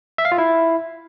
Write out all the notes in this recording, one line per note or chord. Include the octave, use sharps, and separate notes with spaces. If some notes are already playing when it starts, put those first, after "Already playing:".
E5
F5
F4
E4